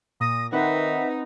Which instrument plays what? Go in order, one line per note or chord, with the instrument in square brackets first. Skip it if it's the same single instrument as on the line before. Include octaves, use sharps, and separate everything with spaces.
[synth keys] A#2 A#6 [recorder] D#6
[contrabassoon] D#3 [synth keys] C4 B4 F#5 [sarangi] D#4 [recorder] E5